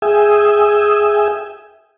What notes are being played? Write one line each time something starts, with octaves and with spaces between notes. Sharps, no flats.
G#4 E5 G5 G#5 D#6 E6